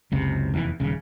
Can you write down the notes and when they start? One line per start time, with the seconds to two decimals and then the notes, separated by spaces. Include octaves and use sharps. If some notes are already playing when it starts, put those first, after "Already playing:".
0.12 F#1 C#2 C3
0.54 F1 E2 B2 E3
0.80 D#1 C#3